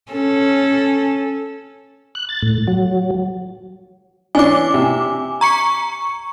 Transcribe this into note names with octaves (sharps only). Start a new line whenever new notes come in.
C#4 A4
F#6
A6
A2
F#3
E3 C#4 D4 G#5 D6
C3
A#5 C#6 C#7